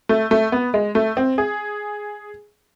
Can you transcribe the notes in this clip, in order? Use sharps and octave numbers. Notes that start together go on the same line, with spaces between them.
A3
A3
B3
G#3
A3
C4
G#4